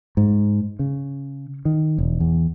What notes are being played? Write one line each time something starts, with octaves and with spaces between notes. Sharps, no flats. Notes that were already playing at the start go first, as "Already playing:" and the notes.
G#2
C#3
D#3
E1
E2